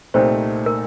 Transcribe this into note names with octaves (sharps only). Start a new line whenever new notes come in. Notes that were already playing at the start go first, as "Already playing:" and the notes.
C2 A#2 A3 C4 D#4 C5
A#4